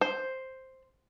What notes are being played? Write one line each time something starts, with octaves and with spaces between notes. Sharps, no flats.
C5